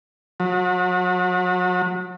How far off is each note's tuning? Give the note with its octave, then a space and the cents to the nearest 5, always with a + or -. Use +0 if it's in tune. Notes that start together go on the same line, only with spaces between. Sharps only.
F#3 -35